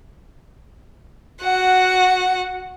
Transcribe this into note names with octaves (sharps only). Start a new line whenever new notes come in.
F#4 F#5